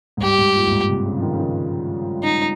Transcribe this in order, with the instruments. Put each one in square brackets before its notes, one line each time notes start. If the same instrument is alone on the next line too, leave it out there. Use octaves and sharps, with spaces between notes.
[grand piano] G#2
[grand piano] G2 [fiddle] G4
[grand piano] G#2
A#2
G2
G#2
C3
C#3
F3
D#3
C#3
D#3
[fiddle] D#4